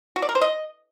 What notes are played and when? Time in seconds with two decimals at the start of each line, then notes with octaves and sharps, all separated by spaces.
0.16 F#4
0.22 D5
0.29 A#4
0.35 C5
0.41 D#5